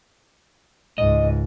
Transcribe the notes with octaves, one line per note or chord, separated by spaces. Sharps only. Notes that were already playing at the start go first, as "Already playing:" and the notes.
C#2 G#2 D#5